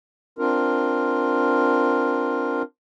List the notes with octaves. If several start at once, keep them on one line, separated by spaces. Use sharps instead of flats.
C4 D4 F4 A#4